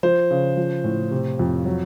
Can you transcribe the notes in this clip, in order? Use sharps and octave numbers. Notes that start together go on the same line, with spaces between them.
F3 C5
C#3
F3
A2
C3
F2
F#3